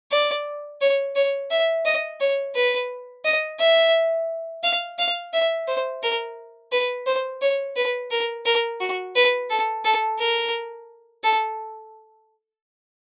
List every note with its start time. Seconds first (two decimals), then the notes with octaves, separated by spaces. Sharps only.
0.11 D5
0.81 C#5
1.15 C#5
1.51 E5
1.85 D#5
2.20 C#5
2.55 B4
3.24 D#5
3.59 E5
4.63 F5
4.99 F5
5.33 E5
5.68 C5
6.03 A#4
6.72 B4
7.06 C5
7.41 C#5
7.76 B4
8.11 A#4
8.46 A#4
8.80 F#4
9.15 B4
9.50 A4
9.85 A4
10.19 A#4
11.24 A4